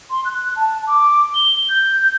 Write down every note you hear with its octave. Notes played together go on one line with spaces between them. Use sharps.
C6
F#6
A5
D6
G7
G6